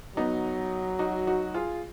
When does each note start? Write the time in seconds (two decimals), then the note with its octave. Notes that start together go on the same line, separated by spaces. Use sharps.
0.16 F#3 B3 D#4
0.99 D#4 F#4
1.27 D#4 F#4
1.54 F4 G#4